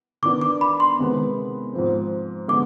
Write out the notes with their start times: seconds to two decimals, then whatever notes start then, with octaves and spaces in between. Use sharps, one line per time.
0.22 D#3 B3 D4 D6
0.41 D6
0.61 B5
0.80 C6
0.99 C3 D#3 G#3 B3
1.73 G#2 F3 C4
2.48 D3 G#3 B3 D6